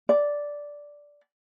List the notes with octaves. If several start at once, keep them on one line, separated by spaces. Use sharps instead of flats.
D5